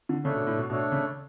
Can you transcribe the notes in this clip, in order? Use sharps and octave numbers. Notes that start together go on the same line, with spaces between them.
D3
C#3 A3 D4 A4 C#5
B2
A2
B2
B2 A3 D4 A4 C#5
C#3